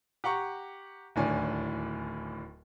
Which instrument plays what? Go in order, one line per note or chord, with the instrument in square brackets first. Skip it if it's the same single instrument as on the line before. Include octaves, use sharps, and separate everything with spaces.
[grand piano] G4 F#5 A#5 C#6
D1 D#2 A2 D4 G#5